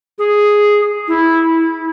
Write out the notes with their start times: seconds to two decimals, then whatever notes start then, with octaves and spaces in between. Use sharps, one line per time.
0.18 G#4
1.08 E4